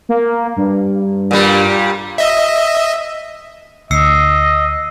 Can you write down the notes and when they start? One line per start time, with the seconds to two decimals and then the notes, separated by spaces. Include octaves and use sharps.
0.09 A#3
0.56 G2
1.31 A#2 G3
2.18 D#5 E5
3.91 D2 D#5 E6 C7 C#7